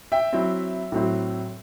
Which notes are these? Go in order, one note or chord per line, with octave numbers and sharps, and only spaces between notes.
E5 G5
F#3 C4 E4
A2 F#3 C4 E4